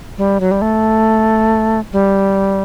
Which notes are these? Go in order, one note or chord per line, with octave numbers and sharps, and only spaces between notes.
G3
F#3
G3
A3
G3